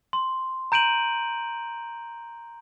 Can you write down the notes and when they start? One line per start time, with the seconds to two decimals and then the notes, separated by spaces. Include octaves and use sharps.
0.13 C6
0.72 A#5 G6 D7 D#7 F#7